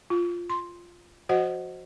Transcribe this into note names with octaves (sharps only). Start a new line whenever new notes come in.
F4
C6
F3 F#4 C5 D#5 F#5